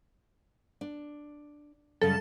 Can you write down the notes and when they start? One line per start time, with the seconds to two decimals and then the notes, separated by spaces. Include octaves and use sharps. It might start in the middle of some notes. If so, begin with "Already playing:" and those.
0.81 D4
2.01 F#2 C#3 G3 A4